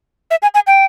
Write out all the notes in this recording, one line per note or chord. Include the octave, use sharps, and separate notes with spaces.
E5
G#5
G#5
G5